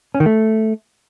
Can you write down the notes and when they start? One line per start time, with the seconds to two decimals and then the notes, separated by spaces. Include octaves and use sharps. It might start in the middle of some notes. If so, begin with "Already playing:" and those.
0.15 C#4
0.20 D#3
0.26 A3